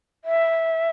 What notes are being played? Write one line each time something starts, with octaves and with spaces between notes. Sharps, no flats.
E5